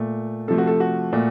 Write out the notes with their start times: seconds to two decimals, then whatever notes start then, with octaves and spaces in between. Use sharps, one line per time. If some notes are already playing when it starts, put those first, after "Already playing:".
Already playing: A#2 A3
0.48 C3 F3 A3 A4
0.58 F#4
0.67 A4
0.80 F#4
1.13 A#2 A3